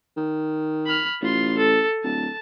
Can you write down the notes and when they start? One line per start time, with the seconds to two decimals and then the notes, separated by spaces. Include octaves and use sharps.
0.17 D#3
0.86 B5 F6
1.22 A1 F4 C6
1.58 A4
2.04 D1 A5